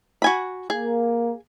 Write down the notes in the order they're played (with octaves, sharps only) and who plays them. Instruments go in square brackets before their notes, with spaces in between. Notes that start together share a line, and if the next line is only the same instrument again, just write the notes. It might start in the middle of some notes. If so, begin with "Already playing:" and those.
[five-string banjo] F#4 G#5 B5
[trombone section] A#3 [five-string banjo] G#4